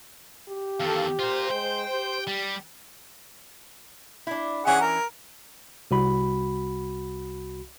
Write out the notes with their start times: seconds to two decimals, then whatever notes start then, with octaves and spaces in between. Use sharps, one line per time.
0.49 G4
0.80 E2 D#3 A4 F5 A5
1.19 F4 A#4 C5
1.51 G#3 G5
1.92 G4
2.27 G3
4.27 D4 E4
4.66 E3 C#4 G#4 E5 F#5
4.81 A#4
5.91 C2 F#4 B5